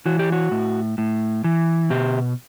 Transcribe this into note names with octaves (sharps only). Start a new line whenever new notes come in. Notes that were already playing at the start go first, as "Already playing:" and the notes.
E3 F#4
G4
F#4
A2
A2
E3
B2 G4